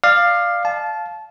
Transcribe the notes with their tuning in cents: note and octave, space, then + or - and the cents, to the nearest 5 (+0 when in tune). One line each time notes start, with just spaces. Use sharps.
D5 +25 F5 +0
F5 +0 A5 -20